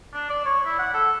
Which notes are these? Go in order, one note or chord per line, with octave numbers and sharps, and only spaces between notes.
D4
D5
C#5
E4
F#5
A4